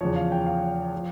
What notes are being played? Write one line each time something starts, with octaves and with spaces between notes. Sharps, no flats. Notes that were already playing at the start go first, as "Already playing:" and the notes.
E2 C#3 F3 C#5
F5
G5
F5
F3